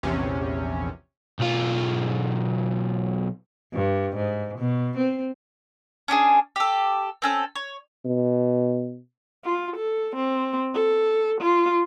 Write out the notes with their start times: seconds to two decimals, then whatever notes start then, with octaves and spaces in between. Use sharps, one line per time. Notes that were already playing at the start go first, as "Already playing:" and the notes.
0.03 A#1 E2 C3 C#4
1.39 B1 F4
3.73 G2
4.15 G#2
4.58 B2
4.97 C4
6.08 C#4 D4 G4 G#4
6.56 G4 A4
7.22 C4 C#4 A4
7.55 C#5
8.05 B2
9.45 F4
9.76 A4
10.16 C4
10.74 A4
11.41 F4